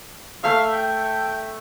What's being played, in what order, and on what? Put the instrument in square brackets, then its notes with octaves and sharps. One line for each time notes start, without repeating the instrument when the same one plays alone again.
[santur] A3 E5 [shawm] F5
[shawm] G5